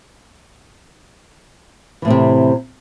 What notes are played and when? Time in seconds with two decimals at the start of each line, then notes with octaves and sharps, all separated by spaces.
2.02 E3
2.05 A2
2.08 C4
2.10 C3